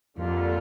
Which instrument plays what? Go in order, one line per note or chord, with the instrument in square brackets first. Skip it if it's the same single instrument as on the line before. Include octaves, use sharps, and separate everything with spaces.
[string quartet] F2 [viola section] D3 G3 A#3 F4 A4